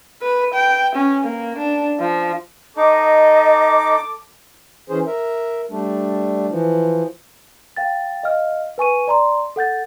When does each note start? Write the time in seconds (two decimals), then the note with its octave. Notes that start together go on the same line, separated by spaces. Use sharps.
0.22 B4
0.54 G5
0.95 C#4
1.24 A#3
1.57 D4
2.00 F3
2.77 D#4 A4 D#5 D6
4.89 E3 C#4 G#4 C5
5.07 A#4 E5
5.70 G3 A3 D4
6.50 E3 F3
7.76 F5 G5 A6
8.23 D#5 F5 F6
8.78 B4 G#5 C#6 D#7
9.08 D5 A#5 C6
9.56 A4 F#5 G6 A6